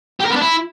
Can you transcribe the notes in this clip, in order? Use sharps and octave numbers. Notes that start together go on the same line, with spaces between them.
G4
A#4
B3
D4
E4